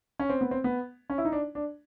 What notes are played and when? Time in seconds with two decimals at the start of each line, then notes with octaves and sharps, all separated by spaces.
0.20 C#4
0.30 C4
0.41 B3
0.51 C4
0.64 B3
1.10 C#4
1.18 E4
1.25 D#4
1.32 D4
1.55 D4